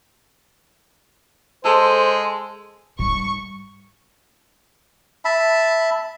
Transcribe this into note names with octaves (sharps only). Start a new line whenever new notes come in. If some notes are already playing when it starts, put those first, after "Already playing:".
G#3 A4 C5
G#2 G3 C#6
E5 A5 B5